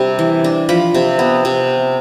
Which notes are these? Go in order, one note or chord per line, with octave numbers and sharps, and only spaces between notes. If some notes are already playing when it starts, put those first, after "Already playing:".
Already playing: C3 G3 D4
E3
D4
F3 B5
C3
B3
C3